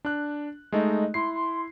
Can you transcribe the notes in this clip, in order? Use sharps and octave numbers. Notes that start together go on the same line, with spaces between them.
D4 F#6
G#3 A3 D#4 D#5
E4 C6 C7
C6